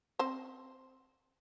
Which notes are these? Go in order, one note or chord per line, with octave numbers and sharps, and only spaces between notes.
C4 C5